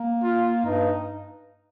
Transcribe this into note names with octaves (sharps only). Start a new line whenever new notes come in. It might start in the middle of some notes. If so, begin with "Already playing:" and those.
Already playing: A#3
F4
G2 D#4